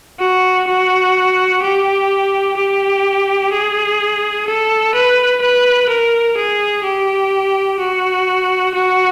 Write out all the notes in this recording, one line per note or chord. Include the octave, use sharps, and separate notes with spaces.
F#4
F#4
G4
G4
G#4
A4
B4
B4
A#4
G#4
G4
F#4
F#4